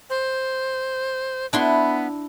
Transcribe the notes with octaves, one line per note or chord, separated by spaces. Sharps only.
C5
B3 D4 E4 C6